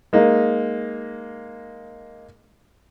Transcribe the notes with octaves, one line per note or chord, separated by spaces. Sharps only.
G#3 A#3 D#4